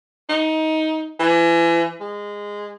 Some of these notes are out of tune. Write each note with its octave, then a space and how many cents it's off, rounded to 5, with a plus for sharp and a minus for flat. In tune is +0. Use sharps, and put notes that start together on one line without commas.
D#4 +20
E3 +35
G#3 -15